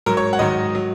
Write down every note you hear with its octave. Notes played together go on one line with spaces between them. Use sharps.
G#2 F#3 A#4
C#5
F#5
G#2 D#3 F#3 D#5
F#3